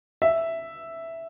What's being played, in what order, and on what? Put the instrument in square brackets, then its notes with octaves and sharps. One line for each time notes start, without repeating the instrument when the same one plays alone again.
[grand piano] E5